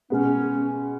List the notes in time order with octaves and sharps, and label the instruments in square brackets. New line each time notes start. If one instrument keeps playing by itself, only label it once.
[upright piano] B2 G#3 B3 [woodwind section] C#4